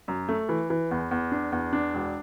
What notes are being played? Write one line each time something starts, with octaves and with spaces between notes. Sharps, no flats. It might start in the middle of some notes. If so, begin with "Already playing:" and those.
F#2
A3
E3
E3
E2
E2
D4
E2
D4
E1